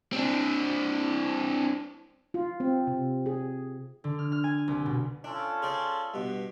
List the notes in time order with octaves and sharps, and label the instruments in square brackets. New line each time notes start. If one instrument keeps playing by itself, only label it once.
[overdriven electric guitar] C4 D4
[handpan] F4
C4
C3
G#4
[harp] D3
F6
F6
G#5
C2
B2
[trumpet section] C#4 F4 A4 [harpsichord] D4
[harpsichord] G#4 C5 D5
G2 B2